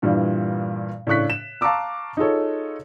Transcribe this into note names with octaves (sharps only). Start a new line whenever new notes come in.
G2 A#2 E3 G3
A2 C#3 D4 C#6 F#6 B6
E7
F5 A5 A#5 C#6 D6 E6
D#4 F4 G#4 A4 C#5